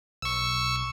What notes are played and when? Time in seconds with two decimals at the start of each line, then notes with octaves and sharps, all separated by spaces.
0.22 B1 C#6 E6